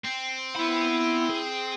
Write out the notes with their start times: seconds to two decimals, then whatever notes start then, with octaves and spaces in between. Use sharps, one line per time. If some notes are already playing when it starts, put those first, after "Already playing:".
0.04 C4
0.56 B3 E4 B5
1.30 G#4